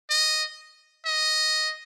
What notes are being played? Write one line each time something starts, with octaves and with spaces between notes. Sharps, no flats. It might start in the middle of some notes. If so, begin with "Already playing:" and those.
D#5
D#5